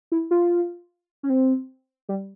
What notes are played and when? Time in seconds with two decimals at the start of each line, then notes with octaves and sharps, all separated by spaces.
0.12 E4
0.31 F4
1.23 C#4
1.30 C4
2.09 G3